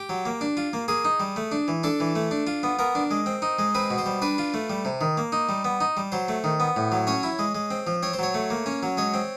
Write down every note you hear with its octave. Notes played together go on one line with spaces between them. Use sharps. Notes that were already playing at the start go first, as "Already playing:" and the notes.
Already playing: G4
F#3
A#3
D4
F4
A#3
A#3 G#4
D#4
G3
A3
D4
E3
D4 A4
E3
A3
D4
F4
B3
B3 A#4
D4
G#3
C4
D#4
G#3
C4 B4
B2
C5
G3
D4 B4
F4
A3
G3
C3
D#3
A#3
D#4
G3
B3
D#4
G3
F#3 C5
A3
D#3
B3
A2
F#3
C#4 C#5
E4
G#3
G#3
C4
F3
C4 C#5
C5
F#3 C#5
A3
A#3
C#4
F#3
G#3 C#5
C4